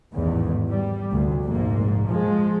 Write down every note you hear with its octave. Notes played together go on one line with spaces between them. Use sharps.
A1 E2 G#2 D#3
G3
F1 D2
F1 A#1 G#2 A#3
F3 G#3